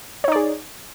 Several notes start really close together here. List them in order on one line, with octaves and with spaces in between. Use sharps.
C#5 D#4 D5 G#4